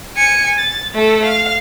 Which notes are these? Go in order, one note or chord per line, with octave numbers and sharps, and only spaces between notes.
G#5 C#7
A6
A3 A4
F5